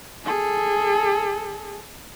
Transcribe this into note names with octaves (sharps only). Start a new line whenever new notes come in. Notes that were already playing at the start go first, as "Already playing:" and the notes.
G#4 A4